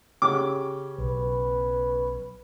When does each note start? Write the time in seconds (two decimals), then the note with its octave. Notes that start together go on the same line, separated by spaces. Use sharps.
0.22 C#3 C#4 G4 D6
0.98 B1 B4